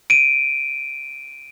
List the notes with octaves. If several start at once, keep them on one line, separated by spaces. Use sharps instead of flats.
D7 D#7